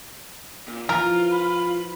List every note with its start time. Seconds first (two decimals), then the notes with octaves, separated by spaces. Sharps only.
0.68 A#2
0.89 E3 F3 F4 A#4
1.31 B5